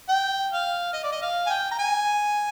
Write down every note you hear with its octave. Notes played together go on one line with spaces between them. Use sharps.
G5
F5
D#5
D5
D#5
F5
G#5
G5
A#5
G#5